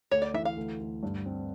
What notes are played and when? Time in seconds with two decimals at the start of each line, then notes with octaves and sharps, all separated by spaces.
0.11 D2 C#5
0.22 D5
0.34 E3 E5
0.45 F5
0.57 D2
0.80 D2
1.03 G2
1.26 C4